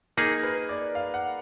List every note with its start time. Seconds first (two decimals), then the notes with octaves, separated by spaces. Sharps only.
0.17 A#3 D#4 G#4 A#4
0.43 B4
0.69 D5
0.95 F5
1.14 F#5